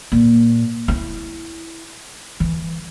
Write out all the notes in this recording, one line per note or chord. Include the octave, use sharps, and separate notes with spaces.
A#2
E4
E3